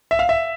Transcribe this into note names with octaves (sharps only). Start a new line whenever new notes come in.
E5
F5
E5